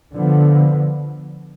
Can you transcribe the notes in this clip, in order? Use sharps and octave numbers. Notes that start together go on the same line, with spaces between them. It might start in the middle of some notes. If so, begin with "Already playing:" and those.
D3 F3 B3